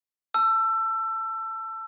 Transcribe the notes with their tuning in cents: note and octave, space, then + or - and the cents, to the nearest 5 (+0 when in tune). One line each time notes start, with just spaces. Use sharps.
A5 +0 E6 +25